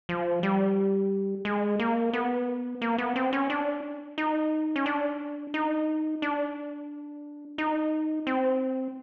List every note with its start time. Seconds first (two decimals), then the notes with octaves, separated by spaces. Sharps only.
0.09 F3
0.43 G3
1.45 G#3
1.79 A#3
2.13 B3
2.82 A#3
2.98 B3
3.16 C4
3.33 C#4
3.50 D4
4.18 D#4
4.76 C#4
4.86 D4
5.54 D#4
6.22 D4
7.58 D#4
8.27 C4